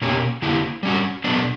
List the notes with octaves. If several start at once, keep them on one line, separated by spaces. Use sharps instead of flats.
B2 A#3 C#4 G4
D3 A#3 E4 G4
G3 C#4 F#4
B2 F#3 B3 D4